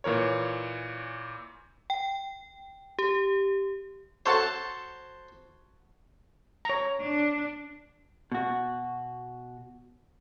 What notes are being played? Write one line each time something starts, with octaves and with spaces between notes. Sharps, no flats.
A#2 E3 A#4 C#5
G5
G4
F#4 A4 C5 C#5 A5
C#5 A#5
D4
B2 F#4